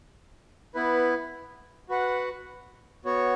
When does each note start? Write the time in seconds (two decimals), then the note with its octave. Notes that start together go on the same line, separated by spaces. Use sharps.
0.75 B3 E4 B4
1.89 F#4 B4 F#5
3.05 B3 F#4 C#5